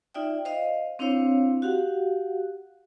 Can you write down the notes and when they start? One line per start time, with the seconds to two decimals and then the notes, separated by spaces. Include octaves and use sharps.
0.14 D#4 F4 D5 E5 G5
0.45 C5 D#5 F5
0.99 C4 D4 E4 C5 C#5 F5
1.62 F#4 G4 F5 F#5